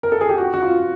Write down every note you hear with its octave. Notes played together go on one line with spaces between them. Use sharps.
A#4
A4
G#4
G4
F#4
F#4
F4